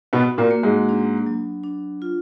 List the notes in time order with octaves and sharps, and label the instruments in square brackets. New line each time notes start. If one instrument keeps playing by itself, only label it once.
[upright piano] B2 B3 [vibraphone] F#4
[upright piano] A#2 A#3
[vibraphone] A#3
[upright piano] G#2 G#3
[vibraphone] D4
F#3
D4
F4